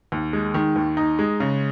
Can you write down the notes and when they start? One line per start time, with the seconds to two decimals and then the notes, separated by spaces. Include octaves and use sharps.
0.12 D#2
0.33 G#3
0.54 D#3
0.76 D#2
0.97 D#4
1.19 G#3
1.40 C#3